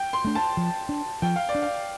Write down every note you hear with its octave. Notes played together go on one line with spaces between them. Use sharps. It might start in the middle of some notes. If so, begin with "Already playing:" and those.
Already playing: G5
C6
A3 D4
A5
F3
D4
F3 G5
F5
D5
D4
F5